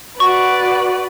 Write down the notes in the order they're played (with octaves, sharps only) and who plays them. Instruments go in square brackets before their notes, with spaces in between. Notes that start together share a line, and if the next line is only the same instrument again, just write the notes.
[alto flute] F#4 [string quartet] B4 D5 [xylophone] C#6